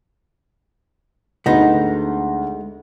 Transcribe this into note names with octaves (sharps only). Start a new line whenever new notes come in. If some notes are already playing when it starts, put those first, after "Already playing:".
D2 G#3 B3 D#4